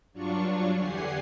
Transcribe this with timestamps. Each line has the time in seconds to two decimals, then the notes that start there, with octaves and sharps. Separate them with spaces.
0.13 G2 F#3 D4 F4 C#6
0.77 E2 D3 G4 F#5 G#5 C7